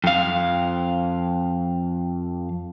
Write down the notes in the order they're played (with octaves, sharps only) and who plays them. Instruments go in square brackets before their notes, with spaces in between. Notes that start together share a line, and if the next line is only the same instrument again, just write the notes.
[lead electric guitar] F2 F5